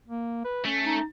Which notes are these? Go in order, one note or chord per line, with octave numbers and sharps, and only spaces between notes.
A#3
B4
A3 C#4
D#4